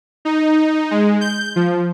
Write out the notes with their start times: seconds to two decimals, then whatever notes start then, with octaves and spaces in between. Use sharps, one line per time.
0.25 D#4
0.91 G#3
1.21 G6
1.56 F3